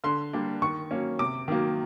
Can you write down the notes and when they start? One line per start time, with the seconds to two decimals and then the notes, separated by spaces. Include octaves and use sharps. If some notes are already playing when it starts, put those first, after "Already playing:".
0.04 D3 C6
0.33 G3 A#3 D4
0.62 D#3 C#6
0.91 F#3 A#3 C#4
1.19 C3 D6
1.48 D#3 F#3 A#3